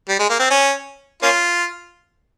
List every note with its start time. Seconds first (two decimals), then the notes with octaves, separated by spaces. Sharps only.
0.09 G3
0.19 G#3
0.29 A#3
0.40 C4
0.50 C#4
1.23 A#3 C#4 F4